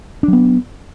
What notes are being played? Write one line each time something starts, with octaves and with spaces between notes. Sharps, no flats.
F#3 B3 D4